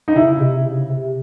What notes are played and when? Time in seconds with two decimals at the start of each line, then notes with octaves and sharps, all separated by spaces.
0.08 D#4
0.16 C#3 E4
0.34 C#3
0.40 C3
0.65 C#3
0.89 C3